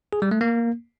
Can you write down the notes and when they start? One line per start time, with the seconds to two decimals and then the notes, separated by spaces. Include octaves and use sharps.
0.13 G#4
0.22 G3
0.31 A3
0.41 A#3